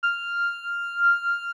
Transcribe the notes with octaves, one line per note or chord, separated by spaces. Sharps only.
F6